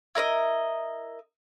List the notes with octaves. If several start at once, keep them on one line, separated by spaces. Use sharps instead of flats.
E4 A#4 D5 D#5